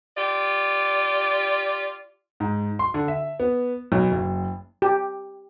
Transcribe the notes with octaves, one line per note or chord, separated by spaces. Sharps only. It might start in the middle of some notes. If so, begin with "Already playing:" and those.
F4 G4 D5
G#2
C6
D3
E5
B3
B1
F#1
G4